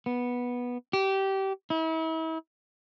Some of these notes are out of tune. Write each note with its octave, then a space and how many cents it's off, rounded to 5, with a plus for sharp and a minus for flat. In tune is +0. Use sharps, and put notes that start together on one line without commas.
B3 -10
G4 -20
E4 -40